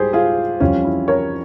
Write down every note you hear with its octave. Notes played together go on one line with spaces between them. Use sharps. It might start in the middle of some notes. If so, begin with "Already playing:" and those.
Already playing: G#2 G3 G4 G#4 C5
F4 G#4
F2 E3 G3 C#4 F4
E4
A#4 C#5